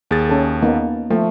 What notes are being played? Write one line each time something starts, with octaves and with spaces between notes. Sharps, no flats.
D#2 G#4 A6
C#4 A4
A#3 B3 D#4
F3 A3